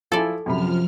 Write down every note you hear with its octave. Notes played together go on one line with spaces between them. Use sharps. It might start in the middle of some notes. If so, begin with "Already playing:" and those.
F3 E4 A4 D5 G#5
F#2 C3 F3 B5 F6